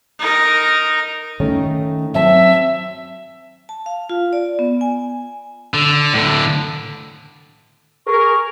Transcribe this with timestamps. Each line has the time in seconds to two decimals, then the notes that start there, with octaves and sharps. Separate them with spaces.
0.19 D#4 A#4
1.40 D#3 A3 C#4
2.14 F#3 C4 E5 A5
3.69 A5
3.86 F5
4.09 F4
4.33 D5
4.59 B3
4.81 G#5
5.74 D3
6.14 A2 D3
8.07 G#4 A#4 C#6